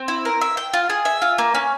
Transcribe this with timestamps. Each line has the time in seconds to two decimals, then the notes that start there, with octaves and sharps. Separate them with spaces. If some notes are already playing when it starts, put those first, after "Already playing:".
Already playing: C4
0.08 E4
0.25 A#4
0.41 E5
0.57 G5
0.74 F4
0.90 G#4
1.05 E5
1.22 F4
1.38 A#3
1.55 C#4